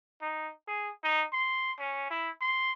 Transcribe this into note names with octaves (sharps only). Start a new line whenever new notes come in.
D#4
G#4
D#4
C6
C#4
E4
C6